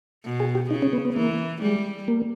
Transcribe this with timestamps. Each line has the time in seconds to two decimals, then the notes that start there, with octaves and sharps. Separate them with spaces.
0.24 B2
0.40 G#4
0.55 G4
0.71 C#3 D#4
0.82 C#4
0.93 B3
1.05 B3
1.16 E3 A#3
1.62 G3 G#3
2.08 A#3